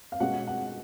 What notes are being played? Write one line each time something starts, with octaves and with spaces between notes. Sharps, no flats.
F5
B2 G#3 C#4 F#5
F#5